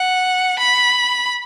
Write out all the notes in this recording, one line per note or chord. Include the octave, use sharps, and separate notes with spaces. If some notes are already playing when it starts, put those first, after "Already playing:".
Already playing: F#5
B5